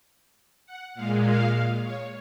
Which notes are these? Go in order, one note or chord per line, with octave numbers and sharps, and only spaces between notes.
F#5
A#2 G#3 F5
F5
C#5